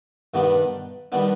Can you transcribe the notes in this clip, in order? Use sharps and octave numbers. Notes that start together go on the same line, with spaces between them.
G2 D#3 G3 B3 D4
D#3 G3 B3 D4